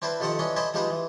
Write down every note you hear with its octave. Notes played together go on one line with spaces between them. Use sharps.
C4 D4 E4 B4 C5
F2 D#3 G4 A4 C5 F#5
E3 C#4 D4 D#5
C5 D5 D#5 G#5 A5 B5
F3 G#3 D#4 G4 B4 C5
E3